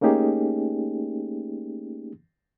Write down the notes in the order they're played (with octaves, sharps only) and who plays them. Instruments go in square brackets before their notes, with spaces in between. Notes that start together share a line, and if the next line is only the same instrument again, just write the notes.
[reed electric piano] A3 A#3 C#4 D#4 G4 G#4